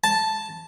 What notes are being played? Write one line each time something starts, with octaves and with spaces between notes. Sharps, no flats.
A5